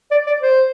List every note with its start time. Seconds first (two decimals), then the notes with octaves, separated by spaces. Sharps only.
0.11 D5
0.26 D5
0.42 C5